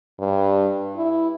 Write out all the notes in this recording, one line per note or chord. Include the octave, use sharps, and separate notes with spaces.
G2
E4